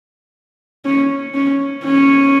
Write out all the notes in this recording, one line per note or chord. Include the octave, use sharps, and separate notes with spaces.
C#4
C#4
C#4